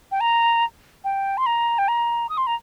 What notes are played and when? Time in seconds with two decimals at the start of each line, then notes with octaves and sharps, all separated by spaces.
0.12 G5
0.21 A#5
1.04 G5
1.37 C6
1.46 A#5
1.78 G5
1.88 A#5
2.29 D#6
2.37 C6
2.47 A#5